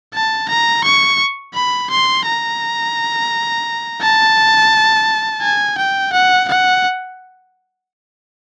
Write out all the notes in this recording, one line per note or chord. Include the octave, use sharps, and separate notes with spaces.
A5
A#5
C#6
B5
C6
A#5
A5
G#5
G5
F#5
F#5